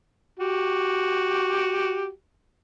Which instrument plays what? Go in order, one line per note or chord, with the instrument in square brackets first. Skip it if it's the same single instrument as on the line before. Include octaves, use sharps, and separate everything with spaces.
[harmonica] F#4 G4